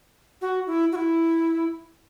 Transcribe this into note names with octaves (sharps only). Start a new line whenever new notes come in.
F#4
E4
F#4
E4